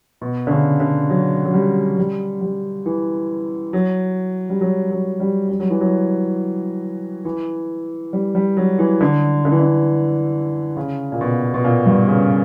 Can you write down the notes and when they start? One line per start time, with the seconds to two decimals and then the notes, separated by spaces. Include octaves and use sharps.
0.21 B2
0.47 D3
0.51 C#3
0.80 D3
1.10 F#3
1.45 F#3
1.54 G3
1.98 G3
2.41 G3
2.86 E3
3.73 F#3
4.50 G3
4.61 F#3
4.91 F#3
5.20 G3
5.49 G3
5.60 F#3
5.70 E3
5.81 F#3
7.25 E3
8.13 G3
8.35 G3
8.57 F#3
8.79 E3
9.01 D3
9.45 D3
9.52 E3
9.59 D3
10.77 C#3
11.12 A#2
11.21 B2
11.54 B2
11.64 A#2
11.86 G2
12.08 C#3